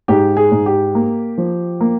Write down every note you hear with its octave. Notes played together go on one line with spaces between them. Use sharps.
G#2 G4
G#4
G#2
G4
A#3
F3
A#3